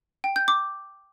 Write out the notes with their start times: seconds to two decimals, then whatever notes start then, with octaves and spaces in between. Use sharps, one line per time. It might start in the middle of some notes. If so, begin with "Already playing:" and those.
0.24 G5
0.36 G6
0.48 D6